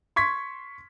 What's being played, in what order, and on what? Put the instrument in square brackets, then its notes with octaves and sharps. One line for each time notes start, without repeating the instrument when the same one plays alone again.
[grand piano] C6 C#6 G#6 B6